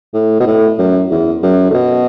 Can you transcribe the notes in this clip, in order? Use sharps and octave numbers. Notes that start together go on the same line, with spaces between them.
A2
B2
A2
F#2
E2
F#2
D3
B2